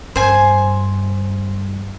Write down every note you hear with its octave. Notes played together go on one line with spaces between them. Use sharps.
G2 C5 G#5